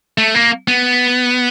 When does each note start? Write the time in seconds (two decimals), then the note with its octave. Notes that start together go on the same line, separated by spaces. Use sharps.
0.18 A3
0.35 A#3
0.68 B3